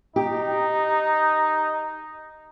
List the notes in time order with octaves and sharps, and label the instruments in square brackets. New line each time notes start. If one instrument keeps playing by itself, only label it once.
[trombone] D#4 [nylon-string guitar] G4